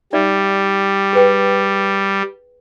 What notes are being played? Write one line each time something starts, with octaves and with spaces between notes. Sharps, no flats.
G3 D#4 D5 E5
G#4 B4 G5